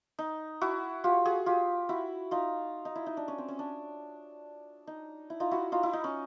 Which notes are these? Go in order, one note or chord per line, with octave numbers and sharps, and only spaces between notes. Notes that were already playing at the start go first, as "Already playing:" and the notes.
D#4
E4 F#4
F4 G4
F#4 G#4
F4 G4
E4 F#4
D#4 F4
D#4
E4
D#4
D4
C#4
C4
C#4
D4
D#4
E4
D#4 F4
E4 F#4
D#4 F4
E4
D#4
C#4